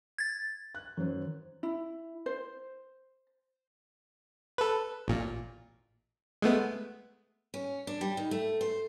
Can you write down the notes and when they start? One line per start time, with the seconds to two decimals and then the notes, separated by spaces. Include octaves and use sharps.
0.18 G#6 A6
0.75 F#6
0.97 F#2 D#3 E3 C5
1.63 E4
2.26 C5
4.58 A4 B4
5.08 A1 A#2
6.42 G#3 A3 B3
7.54 C#4
7.87 D4
8.01 G3
8.17 D#3
8.31 A3
8.61 C5